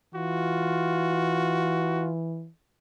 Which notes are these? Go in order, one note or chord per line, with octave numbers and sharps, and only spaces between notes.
E3 F4 F#4